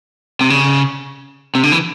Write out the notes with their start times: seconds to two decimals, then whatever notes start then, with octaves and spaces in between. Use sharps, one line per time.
0.41 C3
0.50 C#3
1.55 C3
1.63 D3
1.72 E3